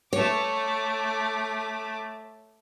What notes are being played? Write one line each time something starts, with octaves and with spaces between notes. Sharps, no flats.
A3 C#5 D6